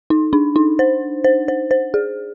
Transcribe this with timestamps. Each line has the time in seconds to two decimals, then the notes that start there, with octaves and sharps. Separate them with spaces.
0.10 D#4
0.33 D4
0.56 D#4
0.79 C5
1.24 C5
1.48 C5
1.71 C5
1.94 G#4